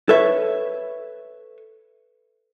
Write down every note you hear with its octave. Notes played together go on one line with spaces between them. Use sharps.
A4 B4 C#5 E5